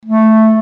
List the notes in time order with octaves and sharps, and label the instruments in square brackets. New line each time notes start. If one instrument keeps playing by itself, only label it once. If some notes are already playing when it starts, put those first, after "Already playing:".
[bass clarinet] A3